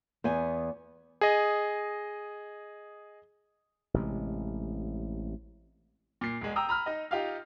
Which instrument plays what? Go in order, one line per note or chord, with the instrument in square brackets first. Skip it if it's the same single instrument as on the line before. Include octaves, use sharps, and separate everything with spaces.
[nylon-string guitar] E2 B3 G#5
[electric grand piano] G#4 D#5
[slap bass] A1 C3 G#3
[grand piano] A#2 C7
E1 G#3
G5 A#5 D#6 E6
A#5 B5 F6
D#4 D#5
D#4 F4 G4 F5